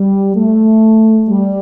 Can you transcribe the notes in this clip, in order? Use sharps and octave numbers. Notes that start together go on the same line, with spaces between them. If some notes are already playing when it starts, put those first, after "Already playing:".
Already playing: G3
A3
G3